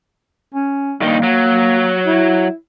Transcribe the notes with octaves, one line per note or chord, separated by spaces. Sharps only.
C#4
G2 D#3 A#3 D#4
F#3
E4